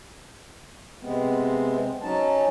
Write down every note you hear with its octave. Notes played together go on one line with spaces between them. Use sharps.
C3 G#3 B3 C4
F#3 C#4 D#4 A5